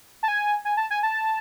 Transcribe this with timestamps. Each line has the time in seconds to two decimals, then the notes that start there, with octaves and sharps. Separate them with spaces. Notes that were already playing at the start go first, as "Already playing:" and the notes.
0.23 A5
0.28 G#5
0.65 G#5
0.77 A5
0.90 G#5
1.03 A5